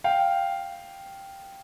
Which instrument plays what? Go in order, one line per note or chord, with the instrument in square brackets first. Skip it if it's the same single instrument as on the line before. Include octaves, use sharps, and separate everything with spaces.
[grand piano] F5 G5